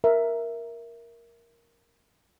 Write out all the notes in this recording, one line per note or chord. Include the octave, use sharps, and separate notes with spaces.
A#4 E5